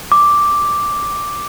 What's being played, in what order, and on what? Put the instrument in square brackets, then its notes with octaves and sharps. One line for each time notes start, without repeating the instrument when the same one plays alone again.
[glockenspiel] D6